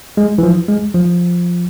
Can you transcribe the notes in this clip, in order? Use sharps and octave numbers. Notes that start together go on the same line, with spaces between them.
G#3
E3
F3
G#3
F3